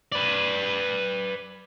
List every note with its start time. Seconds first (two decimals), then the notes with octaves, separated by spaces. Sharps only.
0.12 B4 D5